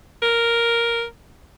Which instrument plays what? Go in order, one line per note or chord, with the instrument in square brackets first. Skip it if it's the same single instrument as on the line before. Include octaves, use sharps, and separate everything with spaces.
[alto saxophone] A#4